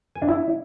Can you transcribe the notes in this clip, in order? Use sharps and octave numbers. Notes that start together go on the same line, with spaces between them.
G#5
D4
E4